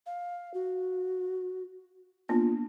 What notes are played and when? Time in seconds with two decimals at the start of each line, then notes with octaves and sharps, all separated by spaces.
0.06 F5
0.54 F#4
2.29 A#3 B3 D4 F4